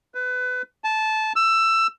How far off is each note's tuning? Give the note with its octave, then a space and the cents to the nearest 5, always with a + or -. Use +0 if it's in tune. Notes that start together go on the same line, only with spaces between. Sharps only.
B4 +25
A5 -15
E6 +15